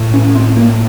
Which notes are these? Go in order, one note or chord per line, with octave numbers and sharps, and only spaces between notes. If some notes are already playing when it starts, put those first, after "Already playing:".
Already playing: A2
C#4
C4
A#3